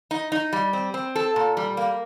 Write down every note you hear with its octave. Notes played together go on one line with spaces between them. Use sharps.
D#4
D#4
G3
C4
C4
A4
A#2
G3
A#3